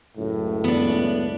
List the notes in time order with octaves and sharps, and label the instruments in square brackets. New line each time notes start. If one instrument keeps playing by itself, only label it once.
[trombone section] C#2 F#2 A2
[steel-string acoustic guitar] B3 D4